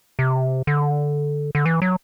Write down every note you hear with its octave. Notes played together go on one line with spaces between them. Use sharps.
C3
D3
D3
E3
F#3